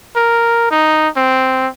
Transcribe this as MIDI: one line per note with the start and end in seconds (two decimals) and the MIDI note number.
0.16 0.69 70
0.71 1.08 63
1.17 1.68 60